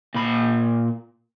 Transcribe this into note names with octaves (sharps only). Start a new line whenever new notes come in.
A#2 B5